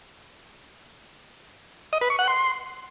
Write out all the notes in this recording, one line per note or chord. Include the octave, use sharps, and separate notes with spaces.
D#5
B4
C#6
F#5
C6